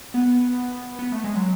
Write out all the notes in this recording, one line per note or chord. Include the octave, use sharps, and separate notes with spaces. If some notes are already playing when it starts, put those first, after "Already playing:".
B3
B3
A3
G#3
F#3